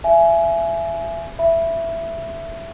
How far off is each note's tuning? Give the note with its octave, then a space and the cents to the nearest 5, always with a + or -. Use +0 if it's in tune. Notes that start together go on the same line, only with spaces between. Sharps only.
E5 +25 G#5 +20
E5 +10 B5 -15